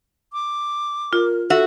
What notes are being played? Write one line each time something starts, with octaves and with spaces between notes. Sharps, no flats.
D6
F4 A#4
F#4 A4 E5